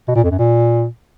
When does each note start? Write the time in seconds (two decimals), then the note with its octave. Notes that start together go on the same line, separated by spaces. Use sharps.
0.08 B2
0.16 A#2
0.23 F2
0.31 F#2
0.38 A#2